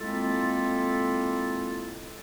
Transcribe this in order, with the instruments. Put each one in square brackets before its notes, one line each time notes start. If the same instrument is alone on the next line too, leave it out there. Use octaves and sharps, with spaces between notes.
[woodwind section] G#3 A#3 C4 E4 F4 A4